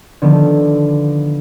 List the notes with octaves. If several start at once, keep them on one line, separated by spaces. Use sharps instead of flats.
D3 D#3 F3 B3